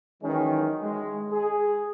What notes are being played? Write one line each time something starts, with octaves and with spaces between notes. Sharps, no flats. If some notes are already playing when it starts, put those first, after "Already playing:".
D#3 E3 F#3 G#3 C#4 D#4
G#3
G#4